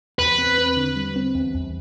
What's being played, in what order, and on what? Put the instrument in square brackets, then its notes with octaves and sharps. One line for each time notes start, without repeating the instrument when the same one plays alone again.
[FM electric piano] E2 [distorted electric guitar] B4
[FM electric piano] C4
C4
D3
G3
C4
E2
E2